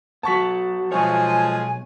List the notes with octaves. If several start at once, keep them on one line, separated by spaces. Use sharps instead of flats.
F#3 B3 A5 C#6 B6
B1 F3 G#3 C#5 G#5